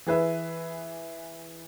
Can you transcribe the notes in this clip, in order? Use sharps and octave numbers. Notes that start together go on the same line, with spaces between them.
E3 G#4 B4 E5